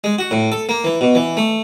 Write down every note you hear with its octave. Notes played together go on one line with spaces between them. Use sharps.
G#3
F#4
A2
A4
A#3
E3
B2
E3
A3